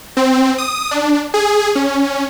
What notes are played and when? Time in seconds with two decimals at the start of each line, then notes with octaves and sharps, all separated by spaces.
0.17 C4
0.58 D#6
0.91 D4
1.34 G#4
1.75 C#4